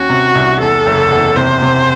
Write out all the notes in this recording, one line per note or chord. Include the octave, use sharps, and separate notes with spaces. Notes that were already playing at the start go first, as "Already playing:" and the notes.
Already playing: D#2 C#4 F#4
C3
C2
E2 A4
F#1
E2
C3 C5
C3